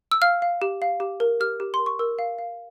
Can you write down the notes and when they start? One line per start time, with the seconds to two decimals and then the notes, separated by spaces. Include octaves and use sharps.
0.12 E6
0.22 F5 F6
0.42 F5
0.62 G4
0.82 F5
1.00 G4
1.20 A#4
1.40 G4 F6
1.60 G4
1.74 C6
1.79 A#4
1.86 C#6
1.99 A#4 E6
2.19 F5
2.39 F5